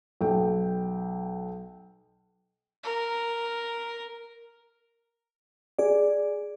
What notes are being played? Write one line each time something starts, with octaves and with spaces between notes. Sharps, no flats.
B1 G5
A#4
G#4 D5